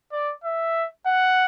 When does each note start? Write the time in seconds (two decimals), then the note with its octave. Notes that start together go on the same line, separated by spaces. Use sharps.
0.12 D5
0.44 E5
1.06 F#5